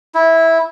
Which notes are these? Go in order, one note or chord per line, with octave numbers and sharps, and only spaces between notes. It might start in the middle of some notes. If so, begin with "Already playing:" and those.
E4